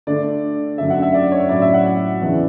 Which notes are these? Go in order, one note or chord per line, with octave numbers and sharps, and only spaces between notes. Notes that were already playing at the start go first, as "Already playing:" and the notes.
D3 A3 D4 D5
F#2 D3 A3 E5
F#5
E5
D5
C#5
A2 F#3 C#4 E4 D5
E5
F#5
E2 C#3 E3 B3 D4